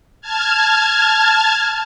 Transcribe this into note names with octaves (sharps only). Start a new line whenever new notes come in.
A5 F6 G#6